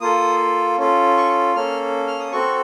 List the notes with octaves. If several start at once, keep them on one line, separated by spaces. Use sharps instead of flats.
A#3 F4 A4 D#6
C#4 F4 A4
C#6
A#3 C#4 A4 F6
F6
D#6
C4 F#4 A4 C#6